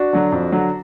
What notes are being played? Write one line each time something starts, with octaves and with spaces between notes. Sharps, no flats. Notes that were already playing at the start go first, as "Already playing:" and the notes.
Already playing: D4 F#4
D3 F#3
F2
D3 F#3